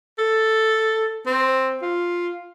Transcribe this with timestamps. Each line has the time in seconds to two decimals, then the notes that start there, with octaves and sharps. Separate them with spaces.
0.18 A4
1.26 C4
1.82 F4